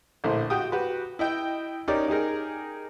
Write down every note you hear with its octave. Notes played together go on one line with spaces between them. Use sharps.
A#1 A2 D3 C5
F#4 G4 G5 D#6
F#4 G4 B4
E4 D#5 G5
C#4 D#4 G4 A#4 D5
D#4 G4 G#4 A#4